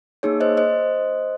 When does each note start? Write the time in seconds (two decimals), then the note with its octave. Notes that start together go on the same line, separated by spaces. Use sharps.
0.23 A#3 D#4 G#4 C#5
0.40 C5 D#5
0.57 C5 D#5